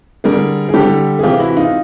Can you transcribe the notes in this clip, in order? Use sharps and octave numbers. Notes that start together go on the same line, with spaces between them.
D3 G3 G#4 A#4
G#4
D3 G3 G4 A4
G#4
C3 E3 G#3 F4 G4
E4 F#4
D#4 F4